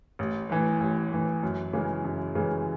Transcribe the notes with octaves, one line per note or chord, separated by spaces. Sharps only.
A1
A2 E3
A1
A2 E3
F#2
C#3 E3 G#3
F#2
C#3 E3 G#3